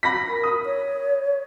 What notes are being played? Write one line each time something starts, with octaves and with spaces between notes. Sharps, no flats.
B5 A#6 B6
A#4
D#6
C#5